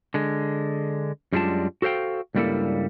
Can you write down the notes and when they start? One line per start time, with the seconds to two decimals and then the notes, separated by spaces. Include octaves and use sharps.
0.14 D3 G#3
1.33 F#2 G3 G#3 D4 F4 A5
1.82 F#4 A4 C5 F5 G5
2.35 C#2 G2 G3 A#3 E4 A4